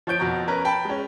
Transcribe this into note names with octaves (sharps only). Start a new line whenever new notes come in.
F3 C#5 G6 D7
F2 B2 F#4 A#5
C#4 A#4 B4
G5 A5 B5
G#3 C#4